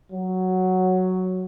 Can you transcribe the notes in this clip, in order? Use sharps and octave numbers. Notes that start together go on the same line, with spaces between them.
F#3